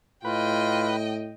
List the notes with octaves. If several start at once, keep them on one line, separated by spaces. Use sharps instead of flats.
A2 F4 B4 D#5 G5